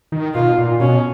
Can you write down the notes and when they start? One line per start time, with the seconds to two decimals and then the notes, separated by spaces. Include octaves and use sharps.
0.12 D#3
0.34 B2 F4
0.58 A#2
0.80 B2 C#4